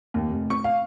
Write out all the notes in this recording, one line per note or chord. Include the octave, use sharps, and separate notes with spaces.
D#2
F1
C#6
F5